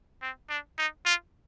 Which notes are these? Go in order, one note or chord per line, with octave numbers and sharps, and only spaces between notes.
C4
D4
D#4
F4